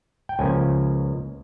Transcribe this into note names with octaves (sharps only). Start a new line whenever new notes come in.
G5
C#2 C#3 F3 A#3 C#4 G#5